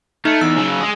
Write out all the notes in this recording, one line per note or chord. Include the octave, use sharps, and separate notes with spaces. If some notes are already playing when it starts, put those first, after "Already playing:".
A3 D#4
E2 E6
C#3 F#3
G#3 G#4